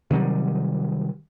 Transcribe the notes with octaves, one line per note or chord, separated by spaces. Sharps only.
C3 D#3 F#3 G3